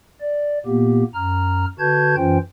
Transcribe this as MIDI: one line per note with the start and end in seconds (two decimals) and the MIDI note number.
0.21 0.58 74
0.66 1.03 46
0.66 1.03 58
0.66 1.03 59
0.66 1.03 67
1.14 1.66 42
1.14 1.66 82
1.14 1.66 89
1.79 2.15 50
1.79 2.15 66
1.79 2.15 71
1.79 2.15 81
1.79 2.15 91
1.79 2.15 92
2.17 2.38 42
2.17 2.38 52
2.17 2.38 61
2.17 2.38 65
2.17 2.38 72
2.17 2.38 79